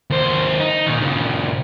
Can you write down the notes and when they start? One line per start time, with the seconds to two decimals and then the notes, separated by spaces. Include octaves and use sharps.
0.10 D#2 C5
0.60 D#4
0.86 A#2 D#3
1.00 A#2 C#3